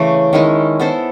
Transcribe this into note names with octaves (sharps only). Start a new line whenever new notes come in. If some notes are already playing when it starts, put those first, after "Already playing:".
Already playing: C#3 E3 A3
D#3 G#3 C#4 E4
B3 E4 A4 C5